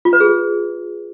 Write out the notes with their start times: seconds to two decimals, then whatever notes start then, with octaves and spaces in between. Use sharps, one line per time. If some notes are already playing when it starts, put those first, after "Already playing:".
0.05 F4
0.13 B4
0.20 G#4